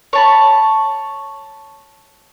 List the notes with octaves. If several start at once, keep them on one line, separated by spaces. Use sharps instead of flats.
C#5 A5 B5